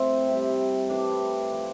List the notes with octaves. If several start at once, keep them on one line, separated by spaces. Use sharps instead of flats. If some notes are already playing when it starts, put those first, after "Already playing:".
Already playing: A2 F3 C4
C3 G3
A2 E3 G3 D4
F3